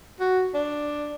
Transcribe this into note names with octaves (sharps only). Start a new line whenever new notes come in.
F#4
D4